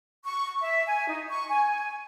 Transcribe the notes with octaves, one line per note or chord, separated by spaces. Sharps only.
C#6
E5
G#5
D#4
C#6
G#5